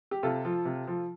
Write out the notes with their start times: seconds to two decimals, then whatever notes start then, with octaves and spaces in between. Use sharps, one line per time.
0.11 G4
0.23 C3 F4 A4
0.45 F3
0.65 C3
0.87 F3